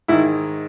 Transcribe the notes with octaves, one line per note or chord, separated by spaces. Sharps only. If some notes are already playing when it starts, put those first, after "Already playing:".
G#2 D#3 E4